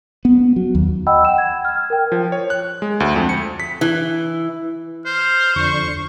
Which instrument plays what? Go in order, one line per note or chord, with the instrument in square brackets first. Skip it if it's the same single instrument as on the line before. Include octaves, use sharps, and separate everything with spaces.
[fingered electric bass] B3
F#3
D#2
[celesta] D#5 F#5 G5 B5 E6
F#5 G5 E7
G#6
F6 G#6
A#4 G5
[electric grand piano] F3
C#5
F#6
G#3
D2
F2
C#7
B6
[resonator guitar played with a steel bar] E3
[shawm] C5 [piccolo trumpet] F6
[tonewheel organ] F2 D3 [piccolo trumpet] C#6